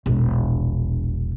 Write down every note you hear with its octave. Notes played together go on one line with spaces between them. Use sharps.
E1 A#1